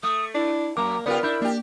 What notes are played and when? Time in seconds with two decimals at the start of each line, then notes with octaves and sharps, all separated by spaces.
0.03 A3 D#6
0.34 D4 E4
0.77 F#2 A#3 A#5 D6
1.06 C#3 B3 F4 G4 A#4 D5
1.23 D4 E4 B5 G6
1.42 A#3 D4 G4